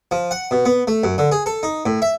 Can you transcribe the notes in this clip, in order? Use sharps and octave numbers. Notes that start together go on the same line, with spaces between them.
F3
F#5
B2
B3
A3
F#2
D3
G#4
A4
D#4
A2
E5